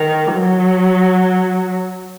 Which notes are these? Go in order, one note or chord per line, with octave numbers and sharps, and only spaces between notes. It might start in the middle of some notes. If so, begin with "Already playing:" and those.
Already playing: D#3
F#3